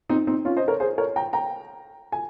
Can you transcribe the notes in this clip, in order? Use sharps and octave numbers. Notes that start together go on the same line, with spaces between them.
C4 D#4
C4 D#4
C#4 F4
C5 D#5
A#4 C#5
G#4 C5
A#4 C#5
G5 A#5
G5 A#5
G#5